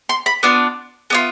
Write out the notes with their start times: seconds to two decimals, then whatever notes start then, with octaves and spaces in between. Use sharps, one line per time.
0.09 C6
0.26 B5
0.43 B3 D4 F4
1.10 B3 D4 F4